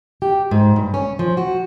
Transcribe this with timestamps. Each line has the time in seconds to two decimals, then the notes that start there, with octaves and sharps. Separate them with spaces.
0.22 G4
0.51 G#2
0.76 G2
0.94 C#4
1.19 F3
1.37 F#4